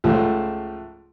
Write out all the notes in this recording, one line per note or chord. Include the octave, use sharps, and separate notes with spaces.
C#2 G#2 F3 A3